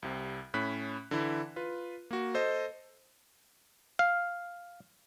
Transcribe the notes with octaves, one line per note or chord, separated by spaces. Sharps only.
C2 C3
A2 C#4 B5 F#6 B6
D3 E3 E4
F4 B4
A#3 F#4
A4 C5 D#5
F5